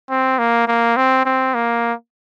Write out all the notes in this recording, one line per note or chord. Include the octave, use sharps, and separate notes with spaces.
C4
A#3
A#3
C4
C4
A#3